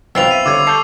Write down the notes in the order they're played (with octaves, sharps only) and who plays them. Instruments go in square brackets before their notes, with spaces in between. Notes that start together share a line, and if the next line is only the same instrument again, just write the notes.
[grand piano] B1 F#2 [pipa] B3 C4 F4 [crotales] E6 C7 F7
[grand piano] E5 [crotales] D#7
[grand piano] D3 G3 C#5 [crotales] D6 E6 G#6
[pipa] A4 [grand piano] C#6 G6 C7